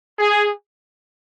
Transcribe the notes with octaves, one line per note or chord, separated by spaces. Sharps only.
G#4